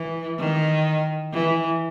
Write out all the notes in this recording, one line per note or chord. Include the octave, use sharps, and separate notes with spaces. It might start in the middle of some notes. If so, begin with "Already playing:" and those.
Already playing: E3
D#3
E3